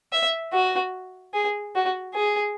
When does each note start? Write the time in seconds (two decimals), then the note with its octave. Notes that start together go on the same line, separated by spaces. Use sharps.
0.13 E5
0.53 F#4
1.34 G#4
1.75 F#4
2.15 G#4